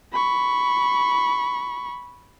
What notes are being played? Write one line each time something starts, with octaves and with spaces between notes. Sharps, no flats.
B5 C#6